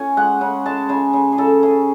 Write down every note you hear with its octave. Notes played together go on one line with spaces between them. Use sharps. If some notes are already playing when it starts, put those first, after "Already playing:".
Already playing: C#4 G#5
G#3 F#5
C#3
G#3 A5
C#3 G#5
C#3
G#4
C#3 A4
C#3 G#4